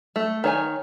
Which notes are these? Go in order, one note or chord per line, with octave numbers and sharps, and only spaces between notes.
A3
D#3 C#5 G#5